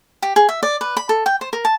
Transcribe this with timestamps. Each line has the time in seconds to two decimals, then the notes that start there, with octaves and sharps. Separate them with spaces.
0.22 G4
0.36 G#4
0.49 E5
0.63 D5
0.81 B4
0.97 B5
1.09 A4
1.26 G5
1.41 C5
1.53 A#4
1.65 A5